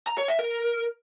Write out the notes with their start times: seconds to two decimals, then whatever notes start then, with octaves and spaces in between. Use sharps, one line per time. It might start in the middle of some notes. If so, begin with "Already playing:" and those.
0.07 A#5
0.18 C#5
0.28 E5
0.39 A#4